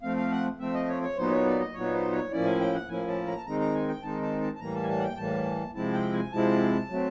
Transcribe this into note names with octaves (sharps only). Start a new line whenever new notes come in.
F3 A3 C4 F5
F5
F#5
F3 A3 C4 E5
D#5
C#5
C#5
A#2 F#3 B3 D#4 C5
C#5
D5
D#5
A#2 F#3 B3 D#4 C#5
C5
C#5
A2 F3 A#3 C#4 E4 D5
G#5
G5
F#5
A2 F3 A#3 C#4 E4 G#5
A5
A#5
A5
D#3 G#3 C4 D#4 A#5
A#5
G#5
G5
D#3 G#3 C4 D#4 A5
A5
A5
A5
A2 E3 G3 A#3 A#5
A5
G#5
A5
F#5
G5
A2 E3 G3 A#3 A5
C3 F3 G#3 C4 E4 A5
G5
G#5
C3 F3 G#3 C4 E4 A5
F#3 A3 C4